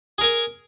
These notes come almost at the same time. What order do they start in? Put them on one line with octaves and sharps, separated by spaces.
G#4 A#4 G#5